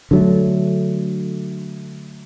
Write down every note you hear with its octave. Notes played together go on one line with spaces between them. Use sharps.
D3 F#3 A3